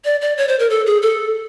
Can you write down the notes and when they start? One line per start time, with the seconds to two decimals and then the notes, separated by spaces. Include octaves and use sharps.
0.05 D5
0.21 D5
0.38 C#5
0.48 C5
0.59 A#4
0.70 A4
0.86 G#4
1.02 A4